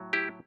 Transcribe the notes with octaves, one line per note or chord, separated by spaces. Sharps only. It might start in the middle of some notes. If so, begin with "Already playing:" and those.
Already playing: A2 F#3
E4 G4